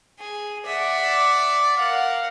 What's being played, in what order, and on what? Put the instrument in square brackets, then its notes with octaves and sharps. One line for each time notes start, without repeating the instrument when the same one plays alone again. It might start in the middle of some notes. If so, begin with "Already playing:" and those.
[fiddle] G#4
[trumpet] D5 [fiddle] E5 F#5
[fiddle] A#4 F#5 [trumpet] F5